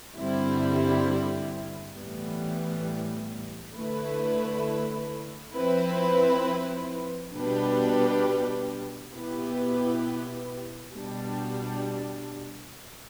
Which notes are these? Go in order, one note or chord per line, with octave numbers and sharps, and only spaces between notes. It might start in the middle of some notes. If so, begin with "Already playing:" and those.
G2 D3 G3 C4 E4
A2 E3 G3 B3
D3 A3 E4 B4
F3 C4 E4 B4
B2 G3 D4 G4 B4
B2 B3 E4 G4 B4
B2 G3 D4